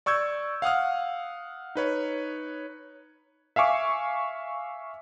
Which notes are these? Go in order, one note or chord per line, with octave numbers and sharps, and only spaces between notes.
D5 C#6 E6 G6 G#6
F5 F#5 D#6 F6
D#4 B4 C#5
E5 F5 G#5 C#6 D6